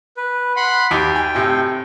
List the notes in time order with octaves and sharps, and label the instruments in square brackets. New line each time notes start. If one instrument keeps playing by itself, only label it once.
[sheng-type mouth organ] B4
F#5 B5 C6
[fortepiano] D#2 D6 [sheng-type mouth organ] G5
[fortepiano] G#5
A2 C3